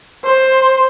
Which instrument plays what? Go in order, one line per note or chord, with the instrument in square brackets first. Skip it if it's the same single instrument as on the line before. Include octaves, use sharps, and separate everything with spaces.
[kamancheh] C5